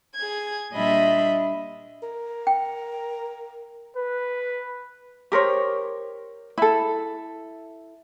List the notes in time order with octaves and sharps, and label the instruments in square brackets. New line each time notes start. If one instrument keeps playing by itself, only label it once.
[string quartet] G#4 G#6
A#2 G3 D4 D#5 E5 B5
[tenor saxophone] A#4
[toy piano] G5
[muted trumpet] B4
[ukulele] G4 A#4 C5 C#5
E4 A4